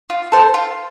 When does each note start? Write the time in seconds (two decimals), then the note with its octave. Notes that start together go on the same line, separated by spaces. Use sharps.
0.10 F4
0.32 A4 C5
0.54 F4